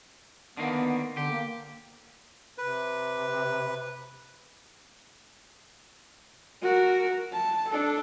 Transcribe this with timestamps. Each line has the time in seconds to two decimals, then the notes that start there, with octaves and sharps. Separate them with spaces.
0.57 D3 D#3 A#3 B3
1.17 D3 G4
1.31 A#3
2.58 C3 B4
6.62 F#4 A#4
7.33 A5
7.68 D4 A4